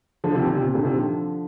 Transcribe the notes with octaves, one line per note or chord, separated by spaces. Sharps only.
D3 F3
C3 D#3
A#2
C3
C3
A#2 D3
C3 D#3
D3 F3